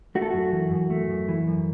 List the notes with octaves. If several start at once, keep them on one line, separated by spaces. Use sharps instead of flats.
A3 F#4
A4
F#2 F#4
E3
F#2
A3
F#2
E3
F#2